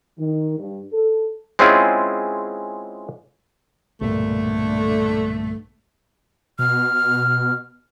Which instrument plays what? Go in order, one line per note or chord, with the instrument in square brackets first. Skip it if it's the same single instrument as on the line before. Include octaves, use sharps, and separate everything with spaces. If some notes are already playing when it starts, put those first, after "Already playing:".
[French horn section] D#3
G2
A4
[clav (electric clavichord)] G#3 C4 C#4 E4 F4 G#4
[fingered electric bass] B1 G2 A#2 [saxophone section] D3 A3
[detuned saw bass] B2 [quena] F6